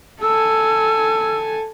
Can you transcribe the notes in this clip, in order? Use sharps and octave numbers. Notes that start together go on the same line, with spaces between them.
A4 G#5 E6